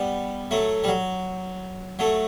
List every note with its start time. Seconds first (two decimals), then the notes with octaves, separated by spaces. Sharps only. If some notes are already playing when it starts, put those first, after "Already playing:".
Already playing: G3 B3
0.51 F#3 A3
0.84 G3
0.88 F#3
1.99 F#3 A3